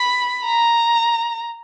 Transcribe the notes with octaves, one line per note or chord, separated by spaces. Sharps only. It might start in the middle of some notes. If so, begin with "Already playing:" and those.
Already playing: B5
A#5